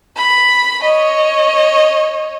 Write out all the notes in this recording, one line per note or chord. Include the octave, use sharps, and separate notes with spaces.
B5
C#5 D#5